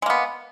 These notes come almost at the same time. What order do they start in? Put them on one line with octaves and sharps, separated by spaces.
G#3 A#3 B3